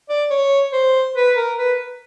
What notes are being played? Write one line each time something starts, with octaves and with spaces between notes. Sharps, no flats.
D5
C#5
C5
B4
A#4
B4